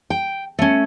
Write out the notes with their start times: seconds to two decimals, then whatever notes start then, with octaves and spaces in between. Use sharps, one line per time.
0.10 G5
0.59 A3 C#4